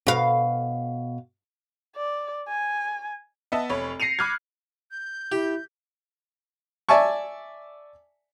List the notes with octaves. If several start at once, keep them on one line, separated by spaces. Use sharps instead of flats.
B2 F5
D5
G#5
B3 D#5 E5 A5
F1 C#5 B5
A#6 C7 C#7 D#7 F7
B5 D6 F6 F#6 G#6
G6
E4 G4
D5 E5 G#5 A5 C#6